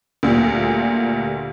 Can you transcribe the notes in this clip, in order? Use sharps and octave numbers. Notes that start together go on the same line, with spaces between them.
D2 A#2 G3